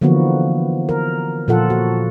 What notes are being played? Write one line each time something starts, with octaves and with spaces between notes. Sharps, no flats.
D3 E3 F3 A#3 B3 F#4
A#4
A#2 F3 F4 A4 F#5
F#4